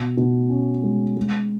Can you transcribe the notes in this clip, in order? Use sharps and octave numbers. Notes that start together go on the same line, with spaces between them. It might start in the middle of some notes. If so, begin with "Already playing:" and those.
Already playing: B2
B2
C#4
G#3
G#3